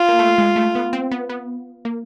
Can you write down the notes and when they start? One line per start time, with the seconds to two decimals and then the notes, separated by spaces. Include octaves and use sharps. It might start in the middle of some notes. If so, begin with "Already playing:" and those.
Already playing: F4
0.09 A#3
0.19 A3
0.38 G#3
0.56 A3
0.75 B3
0.93 C4
1.11 B3
1.29 B3
1.85 A#3